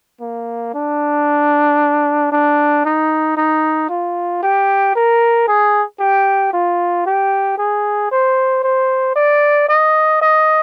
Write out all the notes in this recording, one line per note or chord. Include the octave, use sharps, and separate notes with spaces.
A#3
D4
D4
D#4
D#4
F4
G4
A#4
G#4
G4
F4
G4
G#4
C5
C5
D5
D#5
D#5